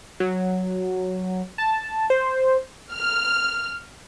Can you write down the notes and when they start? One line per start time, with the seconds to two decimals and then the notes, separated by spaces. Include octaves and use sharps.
0.20 F#3
1.58 A5
2.10 C5
2.93 F6